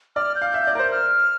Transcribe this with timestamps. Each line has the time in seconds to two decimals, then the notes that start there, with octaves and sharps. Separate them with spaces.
0.16 D5 F6
0.35 G6
0.42 F5
0.54 E5
0.67 D5
0.75 A#4
0.79 C5
0.92 F6